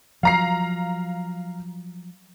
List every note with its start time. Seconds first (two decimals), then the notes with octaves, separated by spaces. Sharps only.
0.23 F3 F#3 F5 A#5 C7